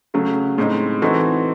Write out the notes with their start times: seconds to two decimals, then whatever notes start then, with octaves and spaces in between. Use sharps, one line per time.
0.14 C#3 F#3 A3
0.58 A2 G#3 C4 D#4
1.02 E3 C4 D#4 F#4 A4